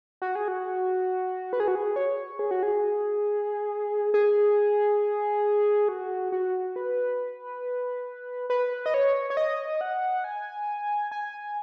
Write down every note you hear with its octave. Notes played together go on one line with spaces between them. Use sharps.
F#4
G#4
F#4
B4
G#4
F#4
G#4
C#5
G#4
F#4
G#4
G#4
F#4
F#4
B4
B4
D#5
C#5
C#5
D#5
F#5
G#5
G#5